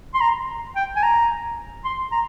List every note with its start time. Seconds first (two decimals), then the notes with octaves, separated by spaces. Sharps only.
0.14 C6
0.21 A#5
0.76 G5
0.96 G#5
1.03 A#5
1.85 C6
2.12 A#5